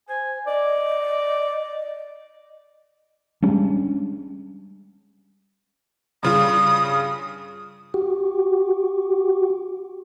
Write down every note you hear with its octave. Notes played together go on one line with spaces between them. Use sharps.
C5 G#5
D5 D#5
G3 G#3 C#4 D4
G2 C#3 F4 D#6
F#4 G4